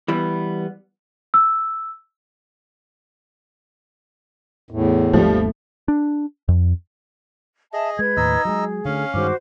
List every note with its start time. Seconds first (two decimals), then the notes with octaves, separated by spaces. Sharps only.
0.08 E3 G3 B3
1.34 E6
4.71 E2 A2
5.13 G#1 D#2 F3 G3 A3
5.88 D4
6.48 F2
7.73 G#4 D#5 E5 A5
7.99 G#3 B4 G#6
8.17 D#2 A2 D#4 D#5 E6
8.45 F#3 G#3 G#4
8.85 D3 A3 C#4 F5
9.14 G2 D#3 G#3 F#4 C5 D6